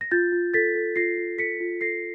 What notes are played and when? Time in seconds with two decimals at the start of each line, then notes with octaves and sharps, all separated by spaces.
0.01 A#6
0.11 F4 G6 A6
0.32 F4
0.54 A4 A6 B6
0.75 A4
0.96 F4 A#6 C7
1.18 F4
1.38 A4 B6 C#7
1.60 F4
1.81 A4 A#6 C7